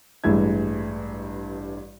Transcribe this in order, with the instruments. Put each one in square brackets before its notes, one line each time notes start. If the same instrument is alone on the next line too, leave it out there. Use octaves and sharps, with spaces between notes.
[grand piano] A1 G2 G#3 E4 E5 G#6